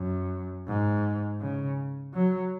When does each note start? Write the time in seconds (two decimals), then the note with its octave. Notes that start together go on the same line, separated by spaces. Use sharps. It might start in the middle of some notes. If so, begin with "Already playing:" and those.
Already playing: F#2
0.67 G#2
1.41 C#3
2.14 F#3